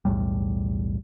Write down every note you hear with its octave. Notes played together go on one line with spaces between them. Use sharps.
B1 E2 A2 G3